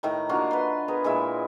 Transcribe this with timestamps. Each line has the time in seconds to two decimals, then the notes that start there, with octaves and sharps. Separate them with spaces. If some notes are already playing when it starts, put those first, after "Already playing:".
0.03 A2 D#3 A#5
0.29 D3 A#3 F4 F#4
0.51 B4 F5 C6
0.88 B3 G#4 A#4
1.04 A#2 G#3 E4 E5